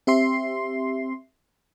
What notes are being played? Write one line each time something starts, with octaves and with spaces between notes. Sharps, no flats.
C4 G4 E5 C6 C7